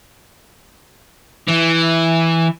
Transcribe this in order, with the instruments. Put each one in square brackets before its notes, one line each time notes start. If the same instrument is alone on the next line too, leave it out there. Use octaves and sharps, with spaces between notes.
[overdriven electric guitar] E3